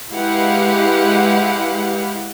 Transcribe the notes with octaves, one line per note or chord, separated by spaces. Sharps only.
G#3 E4 G4 B4 F5 F#5